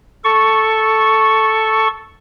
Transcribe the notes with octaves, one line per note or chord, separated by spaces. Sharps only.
A4 C#6